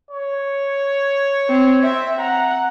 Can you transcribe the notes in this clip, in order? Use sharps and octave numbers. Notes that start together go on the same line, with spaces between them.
C#5
C4
C4 E5
F#5 A#5